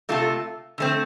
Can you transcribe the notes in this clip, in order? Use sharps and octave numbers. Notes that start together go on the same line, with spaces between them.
C3 A3 F4 A4
D3 A3 C4